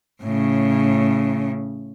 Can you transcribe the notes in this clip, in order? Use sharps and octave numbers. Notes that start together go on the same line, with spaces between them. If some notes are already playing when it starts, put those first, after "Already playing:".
A2 C#3